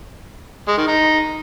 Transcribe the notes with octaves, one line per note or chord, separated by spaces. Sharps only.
G#3
D#3
D#4